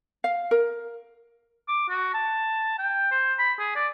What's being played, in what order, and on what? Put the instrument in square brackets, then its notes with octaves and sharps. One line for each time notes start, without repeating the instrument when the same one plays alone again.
[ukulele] F5
A#4
[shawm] D6
F#4
A5
G5
C5
B5
G#4
D5